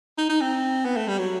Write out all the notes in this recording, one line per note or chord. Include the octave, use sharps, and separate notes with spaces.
D#4
D#4
C4
B3
A3
G3
F#3